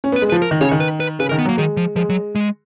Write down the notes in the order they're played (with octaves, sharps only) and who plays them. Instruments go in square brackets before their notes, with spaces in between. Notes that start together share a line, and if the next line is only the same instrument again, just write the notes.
[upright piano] C#4
B3
[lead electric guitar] B4
[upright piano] G#3
[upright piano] F3 [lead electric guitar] B4
[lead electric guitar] A#4
[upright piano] D#3
[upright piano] C#3 [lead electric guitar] C#5
[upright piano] D#3
[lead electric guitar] B4
B4
[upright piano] C#3 [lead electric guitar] B4
[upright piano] D#3 [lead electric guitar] A#4
[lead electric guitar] B3
[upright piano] F#3 [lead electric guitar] A#3
[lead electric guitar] D#3 [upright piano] G#3
[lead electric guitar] F3
[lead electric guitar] F3 [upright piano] G#3
[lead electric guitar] F#3
G#3